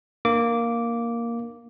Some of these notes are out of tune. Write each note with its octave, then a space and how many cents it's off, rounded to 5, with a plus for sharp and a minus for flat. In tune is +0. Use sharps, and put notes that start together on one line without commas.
A#3 +0 D4 +40 D6 -10